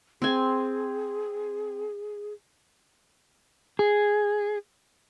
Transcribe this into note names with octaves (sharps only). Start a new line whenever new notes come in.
C4 G#4 G#5
G#4